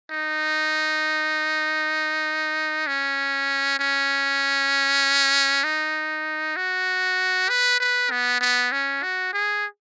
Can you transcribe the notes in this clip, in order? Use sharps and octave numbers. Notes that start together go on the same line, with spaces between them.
D#4
C#4
C#4
D#4
F#4
B4
B4
B3
B3
C#4
F#4
G#4